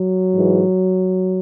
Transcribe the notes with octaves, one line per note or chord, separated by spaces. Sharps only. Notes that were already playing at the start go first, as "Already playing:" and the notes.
Already playing: F#3
G#2 E3